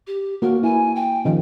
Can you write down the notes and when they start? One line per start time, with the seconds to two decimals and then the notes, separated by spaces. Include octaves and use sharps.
0.07 G4
0.42 A#3 F#4 A#4
0.63 E4 G#5
0.96 G5
1.25 D#3 F3 C#4